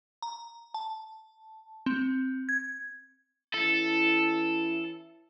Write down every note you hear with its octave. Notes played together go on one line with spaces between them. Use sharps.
A#5
A5
C4
G#6
E3 C#4 E4 A4